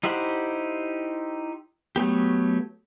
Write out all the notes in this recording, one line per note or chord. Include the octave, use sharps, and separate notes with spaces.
D#4 E4 G4 C5 F#5
F#3 A3 B3 G4